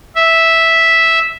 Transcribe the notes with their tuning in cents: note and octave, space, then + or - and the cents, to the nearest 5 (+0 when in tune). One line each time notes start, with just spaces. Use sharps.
E5 -5